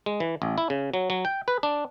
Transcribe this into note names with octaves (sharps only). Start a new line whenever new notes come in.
G#3
E3
A1
E4
C#3
F#3
F#3
G5
B4
D4